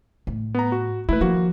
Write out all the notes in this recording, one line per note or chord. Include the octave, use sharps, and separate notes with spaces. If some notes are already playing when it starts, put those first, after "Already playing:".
A2
B3 A#5
F#4
A3 E4 B4
D#3 F3 A#3 F#4